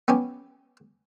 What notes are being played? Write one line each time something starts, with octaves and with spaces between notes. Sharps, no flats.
B3 C#4 G4 G#5